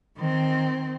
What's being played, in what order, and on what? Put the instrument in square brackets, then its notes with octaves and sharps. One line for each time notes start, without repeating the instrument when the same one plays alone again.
[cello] D#3 C4